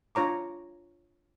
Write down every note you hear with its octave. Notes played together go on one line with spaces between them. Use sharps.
D4 F4 C#5 A#5 D6